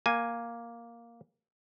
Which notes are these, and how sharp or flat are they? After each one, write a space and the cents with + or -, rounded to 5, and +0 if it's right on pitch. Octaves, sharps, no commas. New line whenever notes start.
A#3 +0 G#5 +0